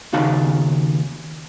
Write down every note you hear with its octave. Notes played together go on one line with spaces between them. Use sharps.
D#2 C#3 D#4 F#4 F5 A5